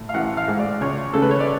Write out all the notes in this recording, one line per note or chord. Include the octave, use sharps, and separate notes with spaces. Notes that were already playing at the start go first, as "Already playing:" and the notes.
Already playing: A2
F5
A1 F#5
F5
G#2
D5
C#2 C#5
C#3 A4
B4
C#5
D5